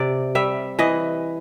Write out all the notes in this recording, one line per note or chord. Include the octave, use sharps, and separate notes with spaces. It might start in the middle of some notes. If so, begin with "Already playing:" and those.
Already playing: C3 D5
G3 E5
E3 D#5